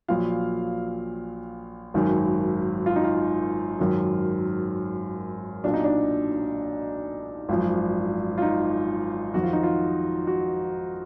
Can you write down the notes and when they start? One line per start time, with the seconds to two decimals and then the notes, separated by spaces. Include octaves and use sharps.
0.08 A#1 A#2 F#3 F5
1.94 G#1 F#2 D#3 F#3
2.86 F4
2.96 D#4
3.04 F4
3.79 G#1 F#2 D#3 F#3
5.64 B1 A#2 F#3 D4
5.74 D#4
5.84 D4
7.49 G#1 F#2 F3
8.38 F4
8.42 D#4
9.34 F2 D#3 F#3 F#4
9.43 F4
9.53 D#4
9.63 F4
10.27 F#4